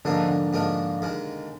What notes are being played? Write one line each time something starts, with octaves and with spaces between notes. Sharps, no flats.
G#2 D3 F3 A#3 D4
D3
G#2 F3 A#3 D4
D#2 D#3 G#3